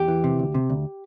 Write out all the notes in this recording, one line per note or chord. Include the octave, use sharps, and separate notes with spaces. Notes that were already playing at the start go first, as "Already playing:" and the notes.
Already playing: E2 G4
E3
C3
D2
C3
D2